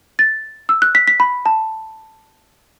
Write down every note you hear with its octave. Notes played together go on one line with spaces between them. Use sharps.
A6
E6
F#6
B6
B6
B5
A5